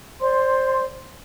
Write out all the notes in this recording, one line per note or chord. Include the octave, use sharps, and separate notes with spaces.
C5 D5 C6